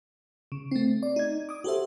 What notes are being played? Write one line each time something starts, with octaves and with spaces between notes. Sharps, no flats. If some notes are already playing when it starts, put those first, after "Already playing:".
C#3
A3 C4
D5
D#4 G#6
D6 D#6
F#4 G4 A4 C5 E5